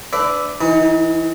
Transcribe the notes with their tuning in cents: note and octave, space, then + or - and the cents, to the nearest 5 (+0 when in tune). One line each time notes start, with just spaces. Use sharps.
D4 -5 B4 +30 E5 +0
E3 +0 D#4 +35